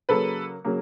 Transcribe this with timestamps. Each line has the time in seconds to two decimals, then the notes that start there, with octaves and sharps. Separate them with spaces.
0.09 C#3 F#3 A#3 A4 B4
0.65 C#3 F#3 A#3